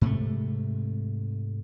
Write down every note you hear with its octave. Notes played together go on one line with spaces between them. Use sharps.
G#2 C3 A3